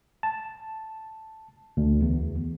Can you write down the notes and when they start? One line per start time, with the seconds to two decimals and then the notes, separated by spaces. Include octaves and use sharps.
0.23 A5
1.77 D2
2.02 E2